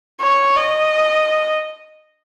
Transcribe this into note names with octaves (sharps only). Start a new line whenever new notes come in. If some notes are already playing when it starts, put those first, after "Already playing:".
C#5
D#5